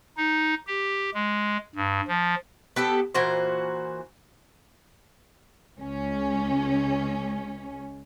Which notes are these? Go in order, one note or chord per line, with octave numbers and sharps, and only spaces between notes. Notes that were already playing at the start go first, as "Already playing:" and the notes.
D#4
G4
G#3
G2
F3
B3 G4 A4
A#2 E3 F#4 C5
C#2 C#4